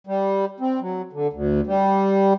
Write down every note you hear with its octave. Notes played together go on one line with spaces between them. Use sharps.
G3
C4
F#3
D3
D2
G3